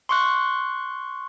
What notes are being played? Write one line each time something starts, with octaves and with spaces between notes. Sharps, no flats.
C6 C#6 F#6